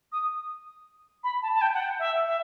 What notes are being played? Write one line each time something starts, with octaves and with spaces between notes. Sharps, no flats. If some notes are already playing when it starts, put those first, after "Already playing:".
D#6
B5
A5
A5
G5
F#5
G5
E5
E5